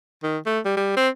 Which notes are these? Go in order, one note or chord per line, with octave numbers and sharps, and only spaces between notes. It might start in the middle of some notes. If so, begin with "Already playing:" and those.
D#3
A3
G3
G3
C4